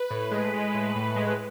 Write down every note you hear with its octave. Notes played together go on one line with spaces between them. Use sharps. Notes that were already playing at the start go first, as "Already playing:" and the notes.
Already playing: B4
A2
G#3
G#3
A2
A2
G#3